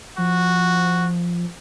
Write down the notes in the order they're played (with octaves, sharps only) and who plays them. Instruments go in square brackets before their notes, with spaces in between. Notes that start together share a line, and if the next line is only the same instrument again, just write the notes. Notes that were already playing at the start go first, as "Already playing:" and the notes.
[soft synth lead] F3 [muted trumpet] F#4